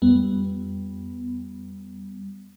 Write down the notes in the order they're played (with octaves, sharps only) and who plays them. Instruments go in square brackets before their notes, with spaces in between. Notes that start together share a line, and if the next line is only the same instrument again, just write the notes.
[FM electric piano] F2 G3 B3